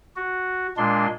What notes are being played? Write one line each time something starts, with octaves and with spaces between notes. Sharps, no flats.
F#4
A#2 G#3 D4 C6